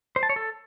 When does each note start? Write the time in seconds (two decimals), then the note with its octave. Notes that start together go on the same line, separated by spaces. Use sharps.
0.16 C5
0.23 A5
0.29 C#5
0.36 A4